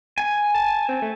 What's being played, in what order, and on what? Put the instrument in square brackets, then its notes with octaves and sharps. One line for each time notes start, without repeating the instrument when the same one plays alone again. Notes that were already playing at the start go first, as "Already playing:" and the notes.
[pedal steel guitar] G#5
[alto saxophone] A5
C4
A3